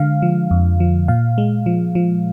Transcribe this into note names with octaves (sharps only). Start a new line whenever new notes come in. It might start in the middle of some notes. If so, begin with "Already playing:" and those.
Already playing: D3 G#3 F5
F3
F2
F3
A#2 F5
G#3
F3
F3